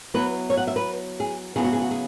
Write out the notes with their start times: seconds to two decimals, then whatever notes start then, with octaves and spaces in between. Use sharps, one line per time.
0.14 F#3 B3 E4 B4
0.50 C#5
0.57 F#5
0.67 E5
0.76 B4
1.20 G#4
1.56 C#3 F#3 B3 E4 G#4
1.64 F#4
1.73 G#4
1.82 F#4
1.91 G#4